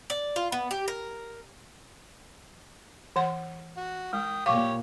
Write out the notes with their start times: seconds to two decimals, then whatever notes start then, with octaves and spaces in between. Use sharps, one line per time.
0.10 D5
0.36 F4
0.52 B3
0.71 G4
0.88 A#4
3.16 E3 F#5 C6
3.77 F#4
4.13 G#3 G5 D#6
4.46 A#2 G4 C#5 F5 C#6 D6